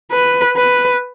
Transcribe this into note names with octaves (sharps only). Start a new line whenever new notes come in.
B4
B4